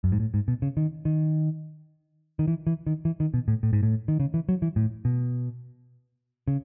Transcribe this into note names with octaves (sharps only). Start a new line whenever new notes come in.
F#2
G#2
A2
G#2
B2
C#3
D#3
D#3
D#3
E3
E3
D#3
E3
D#3
B2
A2
A2
G#2
A2
D#3
C#3
E3
F#3
E3
A2
B2
C#3